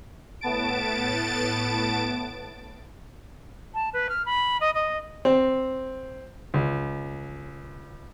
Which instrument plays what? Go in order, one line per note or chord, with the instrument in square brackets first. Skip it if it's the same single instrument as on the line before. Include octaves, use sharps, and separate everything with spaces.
[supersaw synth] A2 B3 A5 A6 D7
[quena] A5
B4
F6
B5
D#5
D#5
[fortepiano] C4
C#2